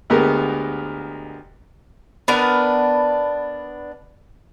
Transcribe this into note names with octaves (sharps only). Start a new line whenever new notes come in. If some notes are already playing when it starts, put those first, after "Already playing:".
D2 G#3 B3 G4 A#4
B3 D4 A#4 B4